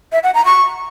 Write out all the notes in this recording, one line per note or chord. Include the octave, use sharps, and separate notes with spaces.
E5
F#5
A#5
C#6